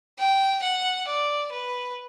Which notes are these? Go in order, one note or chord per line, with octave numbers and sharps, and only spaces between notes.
G5
F#5
D5
B4